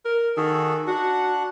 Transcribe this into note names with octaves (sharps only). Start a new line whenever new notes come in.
A#4
D#3 F#4 G#4 A4
D4 F#4 F#5